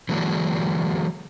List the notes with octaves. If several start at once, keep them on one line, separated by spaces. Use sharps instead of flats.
D3 E3 F#3 G#3 A#3 D4